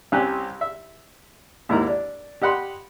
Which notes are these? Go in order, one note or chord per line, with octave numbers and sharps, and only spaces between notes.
C2 C3 C#4 G4 G#5 F#6
E5
D#2 G#2 E4 A#4 A#5
D4
G4 D#5 F#5 B5 C6